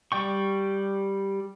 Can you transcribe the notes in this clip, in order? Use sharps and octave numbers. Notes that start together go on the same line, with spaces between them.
G3 D5 G5 C#6